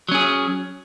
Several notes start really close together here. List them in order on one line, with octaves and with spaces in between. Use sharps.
F#3 C#4 G#4